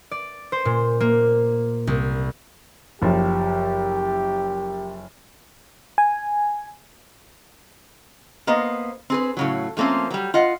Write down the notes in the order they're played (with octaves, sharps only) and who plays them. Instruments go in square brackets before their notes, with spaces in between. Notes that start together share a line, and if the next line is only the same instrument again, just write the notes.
[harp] D5
C5
A#2
A#3
C2
[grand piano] F#1 F3 [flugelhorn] G4
[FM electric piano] G#5
[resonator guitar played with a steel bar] A#3 B3 C5 D#5
C4 G#4 B4
A2 C#3 F#3
F3 A3 A#3 C4 C#4
F#3 G3
F4 D#5 F#5